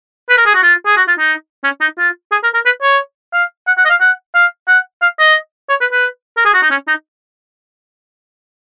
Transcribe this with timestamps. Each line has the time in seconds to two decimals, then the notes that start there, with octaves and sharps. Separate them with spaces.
0.30 B4
0.38 A#4
0.46 G#4
0.54 F#4
0.63 F4
0.86 G#4
0.97 F#4
1.08 F4
1.19 D#4
1.64 C#4
1.81 D#4
1.98 F4
2.32 G#4
2.43 A#4
2.54 A#4
2.65 B4
2.82 C#5
3.33 F5
3.67 F#5
3.78 F#5
3.85 D#5
3.90 F5
4.01 F#5
4.35 F5
4.68 F#5
5.02 F5
5.19 D#5
5.69 C#5
5.81 B4
5.92 B4
6.37 A#4
6.45 G#4
6.54 F#4
6.62 D#4
6.71 C#4
6.88 D#4